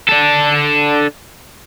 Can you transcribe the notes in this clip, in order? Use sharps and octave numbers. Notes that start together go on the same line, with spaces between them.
D4 A4